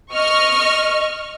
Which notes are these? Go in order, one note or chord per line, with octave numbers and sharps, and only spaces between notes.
D#5 C#6 F6